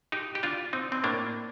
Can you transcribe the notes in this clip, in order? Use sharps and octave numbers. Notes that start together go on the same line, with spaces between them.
D#4 G4
G4
D4 F4
C4 D#4
C4
A2 A#3 D4